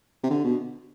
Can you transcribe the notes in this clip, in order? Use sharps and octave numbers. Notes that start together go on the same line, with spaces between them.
C3
D3
B2